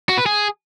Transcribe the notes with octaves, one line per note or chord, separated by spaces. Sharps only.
F#4
B4
G#4